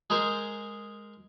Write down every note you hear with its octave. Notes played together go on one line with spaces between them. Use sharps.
G#3 G#4 A#4 C5